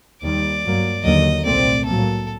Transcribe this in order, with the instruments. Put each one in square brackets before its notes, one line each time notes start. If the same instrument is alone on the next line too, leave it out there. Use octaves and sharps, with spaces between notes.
[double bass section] D#2 D#3 G3 [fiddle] D5
[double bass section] G2 F#3 A#3
[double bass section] D#2 D3 F#3 A#3 [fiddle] D#5
[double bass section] C2 A#2 A3 C4 [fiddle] D5
[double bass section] A2 F#3 A#3 [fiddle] A4